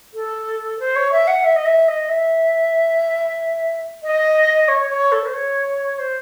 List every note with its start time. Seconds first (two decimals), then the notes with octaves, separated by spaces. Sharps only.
0.14 A4
0.80 C5
0.96 C#5
1.12 E5
1.28 F#5
1.44 E5
1.56 D#5
1.65 E5
1.88 D#5
2.09 E5
4.03 D#5
4.68 C#5
4.90 C#5
5.12 A4
5.26 C5
5.34 C#5
5.99 C5